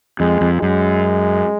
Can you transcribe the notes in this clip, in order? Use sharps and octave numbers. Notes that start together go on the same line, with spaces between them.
F2 G#3
F2
F#2 G#3